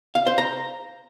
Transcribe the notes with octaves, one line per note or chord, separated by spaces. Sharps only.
F5
C5
A#5